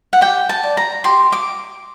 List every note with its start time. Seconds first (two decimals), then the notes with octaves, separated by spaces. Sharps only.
0.13 F#5
0.21 G4 G5
0.49 A5
0.63 D5
0.77 A#5
1.04 G4 C6
1.32 D6